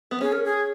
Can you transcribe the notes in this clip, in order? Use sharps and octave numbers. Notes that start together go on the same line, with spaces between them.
B3
C#4 G#4
A#4
G#4